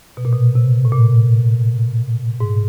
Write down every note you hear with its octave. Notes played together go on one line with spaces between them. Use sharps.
B2
A#2
B2
C3
A2
A#2
G#2